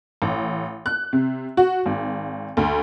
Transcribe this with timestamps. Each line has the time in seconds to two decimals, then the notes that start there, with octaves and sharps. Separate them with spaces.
0.22 A1
0.86 F#6
1.13 C3
1.57 F#4
1.86 G#1
2.57 D2